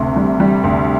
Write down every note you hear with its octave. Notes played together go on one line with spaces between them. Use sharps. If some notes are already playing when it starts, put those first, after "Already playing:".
Already playing: D2 C3
G3
G3
D2